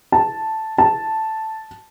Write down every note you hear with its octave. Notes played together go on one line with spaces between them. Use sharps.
A5
A5